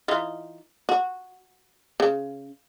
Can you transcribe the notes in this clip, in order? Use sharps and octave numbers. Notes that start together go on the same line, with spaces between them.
E3 D#4 F4
F#4
C#3